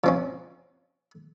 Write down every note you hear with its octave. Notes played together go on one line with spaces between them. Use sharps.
F3 C4 C#4